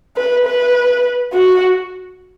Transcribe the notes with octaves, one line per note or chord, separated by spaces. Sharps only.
B4
B4
F#4